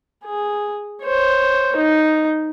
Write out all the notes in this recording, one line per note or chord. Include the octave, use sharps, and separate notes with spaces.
G#4
C5 C#5
D#4